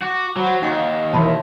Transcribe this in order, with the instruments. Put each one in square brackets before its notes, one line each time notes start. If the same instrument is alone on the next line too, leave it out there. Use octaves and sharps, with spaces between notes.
[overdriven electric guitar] F#4 [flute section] D6
[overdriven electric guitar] F#3 [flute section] C5 F#5 B5
[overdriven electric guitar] D#2 [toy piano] D#4 F#5 C#6 [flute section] D#5 F5
[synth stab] B2 E3 [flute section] A#4 C#5 E5 [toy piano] A5 B5 C6